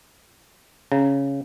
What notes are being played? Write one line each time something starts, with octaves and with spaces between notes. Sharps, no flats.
C#3 C#4